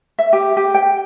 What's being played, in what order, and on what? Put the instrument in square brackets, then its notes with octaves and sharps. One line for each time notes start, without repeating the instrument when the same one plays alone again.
[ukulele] E5
G4
G4
G5